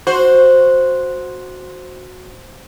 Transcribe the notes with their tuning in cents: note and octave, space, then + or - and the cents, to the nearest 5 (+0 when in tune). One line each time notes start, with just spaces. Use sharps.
F#4 -10 C5 +0